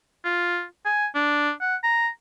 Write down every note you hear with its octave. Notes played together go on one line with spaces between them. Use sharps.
F4
G#5
D4
F#5
A#5